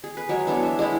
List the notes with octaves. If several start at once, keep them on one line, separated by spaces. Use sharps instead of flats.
G#4
B4
F#3 G#3 C#5
E3 B3 D4 C#5
E5
G#3 E4